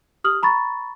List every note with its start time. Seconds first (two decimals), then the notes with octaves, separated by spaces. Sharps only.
0.24 G4 D#6 F6 F#7
0.43 A#5 B5 C#6 A6